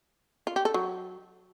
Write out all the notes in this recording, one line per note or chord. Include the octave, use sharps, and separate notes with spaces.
F4
G4
A4
F#3